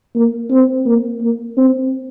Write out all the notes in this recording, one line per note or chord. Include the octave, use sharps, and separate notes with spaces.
A#3
C4
A#3
A#3
C4